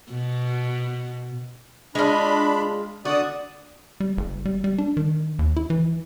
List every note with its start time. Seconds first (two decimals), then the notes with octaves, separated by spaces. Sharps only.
0.11 B2
1.95 G#3 D4 F4 B5
3.05 D3 F#4 D5 D#6
4.00 G3
4.17 F#1
4.45 G3
4.64 G3
4.78 D4
4.97 D#3
5.39 D#2
5.57 E4
5.70 E3